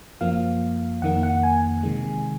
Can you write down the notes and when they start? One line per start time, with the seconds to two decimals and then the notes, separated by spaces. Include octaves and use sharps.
0.21 F#2 F3 A#3 F5
1.02 F2 D#3 A#3 F#5
1.23 F#5
1.43 G#5
1.83 C3 D#3 G#3